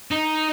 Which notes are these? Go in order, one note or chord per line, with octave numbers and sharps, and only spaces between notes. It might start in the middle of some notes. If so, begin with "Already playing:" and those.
D#4